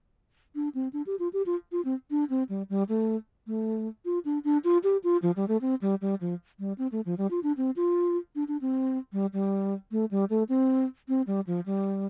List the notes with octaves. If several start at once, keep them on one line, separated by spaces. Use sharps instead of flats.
D4
C4
D4
G4
F4
G4
F4
F4
C4
D4
C4
G3
G3
A3
A3
F4
D4
D4
F4
G4
F4
F3
G3
A3
C4
G3
G3
F3
G3
C4
A3
F3
G3
F4
D4
C4
F4
D4
D4
C4
G3
G3
A3
G3
A3
C4
C4
G3
F3
G3